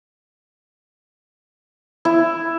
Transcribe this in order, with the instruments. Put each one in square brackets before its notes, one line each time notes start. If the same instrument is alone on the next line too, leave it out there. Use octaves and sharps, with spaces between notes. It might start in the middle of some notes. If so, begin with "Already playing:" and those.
[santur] E4